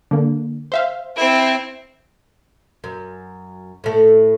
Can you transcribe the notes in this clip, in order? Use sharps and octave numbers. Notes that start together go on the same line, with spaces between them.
D3 A#3
C5 E5 F5
C4 E4
F#2
A2 A3